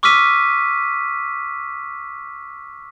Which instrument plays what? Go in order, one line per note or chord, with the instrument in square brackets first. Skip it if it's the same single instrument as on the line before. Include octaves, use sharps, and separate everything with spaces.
[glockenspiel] C#6 D6 E6 F6 B6 D#7